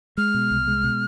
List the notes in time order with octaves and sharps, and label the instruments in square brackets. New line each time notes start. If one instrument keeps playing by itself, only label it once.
[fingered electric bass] G#3 [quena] F6
[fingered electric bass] B2
C2
G#3
B2